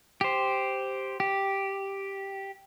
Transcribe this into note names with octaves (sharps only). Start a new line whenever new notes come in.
G4 C5
G4